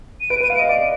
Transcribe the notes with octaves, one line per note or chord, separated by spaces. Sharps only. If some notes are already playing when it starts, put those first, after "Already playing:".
D#7
B4 D7
B4
D#7
F5
D7
D#5
D5 D7